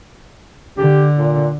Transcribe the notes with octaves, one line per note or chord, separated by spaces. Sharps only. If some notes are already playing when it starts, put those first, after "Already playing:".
D3 G4
A#2